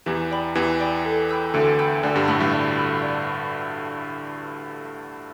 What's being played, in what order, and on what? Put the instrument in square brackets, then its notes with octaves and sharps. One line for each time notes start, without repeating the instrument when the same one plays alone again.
[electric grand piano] E2 E3 [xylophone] G4
[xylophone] D5 G5 B5
[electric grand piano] E2 E3 [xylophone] G4
[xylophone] D5 G5 B5
A4
G5 B5 E6 G6
[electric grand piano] D2 D3 [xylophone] A4
[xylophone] G5 B5 E6 G6
[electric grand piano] D2 D3 [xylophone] D5
[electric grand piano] G2 G3
[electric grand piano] A2 A3 [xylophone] B5 E6
[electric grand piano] G2 G3
[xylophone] D5
B5 E6
D5